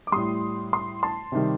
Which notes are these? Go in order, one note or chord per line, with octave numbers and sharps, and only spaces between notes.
D6
A2 G3 C6 D#6
C6 D#6
A5 C6
C3 D#3 G3